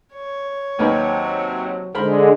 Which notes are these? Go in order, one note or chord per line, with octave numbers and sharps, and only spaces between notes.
C#5
D#2 C3 F#3 A#4 B4
D3 G#3 A#4 C5 B5